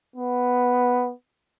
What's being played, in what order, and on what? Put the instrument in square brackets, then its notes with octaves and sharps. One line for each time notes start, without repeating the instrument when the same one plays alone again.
[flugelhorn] B3